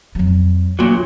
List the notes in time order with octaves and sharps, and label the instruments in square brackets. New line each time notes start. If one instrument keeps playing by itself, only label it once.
[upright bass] F2 F#3
[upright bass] E2 D3 [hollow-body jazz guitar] A#2 F#3